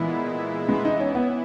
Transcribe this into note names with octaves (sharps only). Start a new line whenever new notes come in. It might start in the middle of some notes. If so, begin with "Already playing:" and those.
Already playing: A#2 E3 G#3 B3 E4
E3 G#3 B3 E4
D#4
C#4
B3